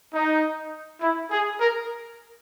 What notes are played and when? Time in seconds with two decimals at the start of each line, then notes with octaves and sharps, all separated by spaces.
0.14 D#4
1.01 E4
1.31 G#4
1.60 A#4